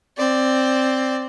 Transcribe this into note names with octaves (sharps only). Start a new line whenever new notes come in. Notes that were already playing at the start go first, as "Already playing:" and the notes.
C4 D5